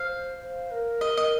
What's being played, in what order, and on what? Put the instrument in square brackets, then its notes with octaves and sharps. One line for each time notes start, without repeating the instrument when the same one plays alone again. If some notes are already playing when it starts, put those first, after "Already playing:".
Already playing: [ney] C5 [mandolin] F5
[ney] C5
A#4
[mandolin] D#5
D#5